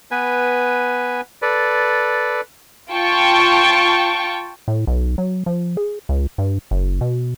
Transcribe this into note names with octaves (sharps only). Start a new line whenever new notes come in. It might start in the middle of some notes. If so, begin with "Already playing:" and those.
B3 B4 G#5
A4 B4 D5
F4 G5 A5 C#6
A2
B1
F#3
F3
G#4
C#2
G2
F#1
B2